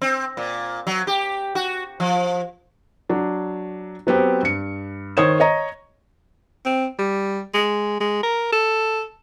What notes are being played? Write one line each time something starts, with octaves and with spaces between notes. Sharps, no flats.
C4
A#2
F#3
G4
F#4
F3
F#3 D4
F#3 B3 C4 G4
G2 C#7
D#3 C5 C#5 D#6 G#6 E7
C#5 D#5 A#5
C4
G3
G#3
G#3
A#4
A4